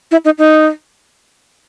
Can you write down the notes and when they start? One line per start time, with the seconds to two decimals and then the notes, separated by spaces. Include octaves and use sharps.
0.11 E4
0.25 D#4
0.38 D#4